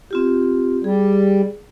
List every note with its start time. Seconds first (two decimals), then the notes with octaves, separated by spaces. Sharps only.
0.11 C4 F4 G4
0.84 G3 G#4